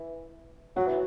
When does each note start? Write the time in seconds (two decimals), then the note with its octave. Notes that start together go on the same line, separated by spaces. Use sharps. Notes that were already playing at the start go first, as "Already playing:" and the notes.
Already playing: E3
0.76 F#3 F#4
0.87 E3